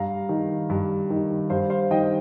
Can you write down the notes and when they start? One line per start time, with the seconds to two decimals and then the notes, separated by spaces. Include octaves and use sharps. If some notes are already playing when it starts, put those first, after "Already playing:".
Already playing: G2 F5 A#5
0.29 D#3
0.69 G2
1.10 D#3
1.50 G2 C5 F5
1.70 C5 F5
1.91 D#3 D#5 G5